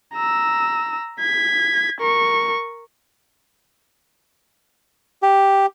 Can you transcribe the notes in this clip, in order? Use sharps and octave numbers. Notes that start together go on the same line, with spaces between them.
A#5 E6
G#6 B6
A#4 C#6
G4